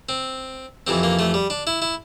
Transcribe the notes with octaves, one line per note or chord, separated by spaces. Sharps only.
C4
F2 C3 E3 C4
A#3
A3
G3
D4
E4
E4